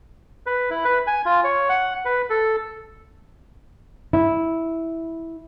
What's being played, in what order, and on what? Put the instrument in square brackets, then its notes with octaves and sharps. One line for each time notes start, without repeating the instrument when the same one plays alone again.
[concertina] B4
E4
B4
G#5
F4
C#5
F#5
B4
A4
[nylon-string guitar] E4